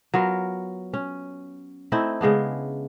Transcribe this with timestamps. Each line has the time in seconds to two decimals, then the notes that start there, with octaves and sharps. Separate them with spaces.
0.14 F#3 B3 F4 A#4
0.94 C#4
1.92 A3 C4 D#4 E4
2.21 C#3 G#3 B3 D4